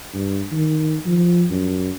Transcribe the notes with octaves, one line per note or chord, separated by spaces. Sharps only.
G2
D#3
F3
F#2